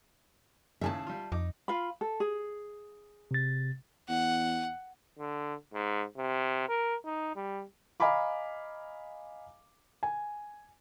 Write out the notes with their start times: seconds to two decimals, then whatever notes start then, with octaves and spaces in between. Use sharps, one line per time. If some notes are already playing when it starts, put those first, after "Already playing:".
0.81 D#2 A2 C#3 E5 G#5 A5
1.07 G3 F4
1.32 F2 D#4 D6
1.68 F4 F5 B5
2.01 A4
2.20 G#4
3.31 C3 A6
4.09 E2 F#5
5.19 D3
5.74 G#2
6.17 C3
6.69 A#4
7.05 D#4
7.36 G3
8.00 D#5 F5 G#5 A#5 B5 D6
10.03 G#5